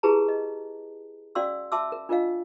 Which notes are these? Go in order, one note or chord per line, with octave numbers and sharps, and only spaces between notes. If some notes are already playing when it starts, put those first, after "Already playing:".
E4 G4 G#4 B4 A5 A#5
D#5
C#4 F#4 D5 F5 C6 E6
E5 A5 C6 D6 E6
A#4
D4 F4 A#4 D#5 F5